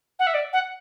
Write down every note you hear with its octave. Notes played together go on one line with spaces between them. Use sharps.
F#5
E5
D5
F#5